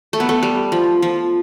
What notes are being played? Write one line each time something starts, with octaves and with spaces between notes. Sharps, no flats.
A3
B3
A3
G3
F3
F3